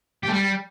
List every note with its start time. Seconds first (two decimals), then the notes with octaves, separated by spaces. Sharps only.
0.23 G4
0.28 A3
0.33 G3